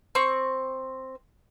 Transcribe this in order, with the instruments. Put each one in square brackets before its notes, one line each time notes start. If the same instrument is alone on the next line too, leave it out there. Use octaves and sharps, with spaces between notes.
[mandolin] C4 C#6